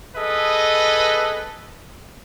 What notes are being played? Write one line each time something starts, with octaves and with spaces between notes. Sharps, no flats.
G#4 A4 B4 D#5